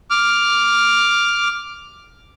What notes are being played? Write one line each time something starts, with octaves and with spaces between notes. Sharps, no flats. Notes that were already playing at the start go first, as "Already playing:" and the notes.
D6 F6